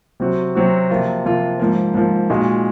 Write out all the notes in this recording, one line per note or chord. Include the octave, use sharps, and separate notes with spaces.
C3 F#3 C4 F#4
C3 F#3 C4 F#4
C3 F3 A#3 F4
C3 F3 A#3 F4
G#2 F3 A#3
G#2 F3 A#3
A#2 G#3 D#4 F#4